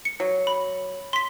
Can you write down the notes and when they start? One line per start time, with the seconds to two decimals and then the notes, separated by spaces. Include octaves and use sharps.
0.05 C#7
0.20 F#3
0.47 B5
1.13 C6 B6